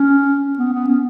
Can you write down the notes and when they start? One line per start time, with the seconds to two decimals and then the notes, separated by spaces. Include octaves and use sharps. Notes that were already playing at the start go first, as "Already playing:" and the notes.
Already playing: C#4
0.58 B3
0.73 B3
0.88 C#4